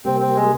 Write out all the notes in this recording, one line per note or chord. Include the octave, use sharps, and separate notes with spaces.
C3 G3 A#3 C4
C4
G#3